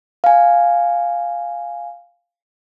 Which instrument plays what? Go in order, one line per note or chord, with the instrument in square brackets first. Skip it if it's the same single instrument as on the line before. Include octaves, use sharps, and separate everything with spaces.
[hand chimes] F5 G#5